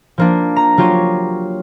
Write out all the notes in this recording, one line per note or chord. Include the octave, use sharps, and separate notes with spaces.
F3 A#3 D4
A#5
F#3 F4 G4 C#5 D#7